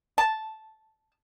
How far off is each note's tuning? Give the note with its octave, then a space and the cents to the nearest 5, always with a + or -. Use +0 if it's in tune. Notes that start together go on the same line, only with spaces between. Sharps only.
A5 -5